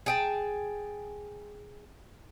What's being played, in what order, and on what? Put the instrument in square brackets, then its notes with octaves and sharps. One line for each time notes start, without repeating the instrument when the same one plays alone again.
[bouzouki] G#4 G5 A5